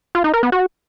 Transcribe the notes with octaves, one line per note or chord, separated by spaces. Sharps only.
F4
D#4
A#4
B3
F#4